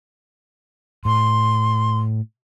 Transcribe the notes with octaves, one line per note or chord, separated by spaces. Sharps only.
A2 C6